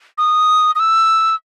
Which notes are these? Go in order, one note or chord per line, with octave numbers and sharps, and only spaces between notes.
D#6
D#6
E6